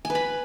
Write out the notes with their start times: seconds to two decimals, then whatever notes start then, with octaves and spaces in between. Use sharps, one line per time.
0.05 G#5
0.10 B4
0.15 B5